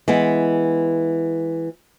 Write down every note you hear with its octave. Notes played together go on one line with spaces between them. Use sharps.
E3 G#3 B3